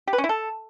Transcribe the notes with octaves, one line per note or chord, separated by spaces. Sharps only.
G4
B4
C#4
E4
A4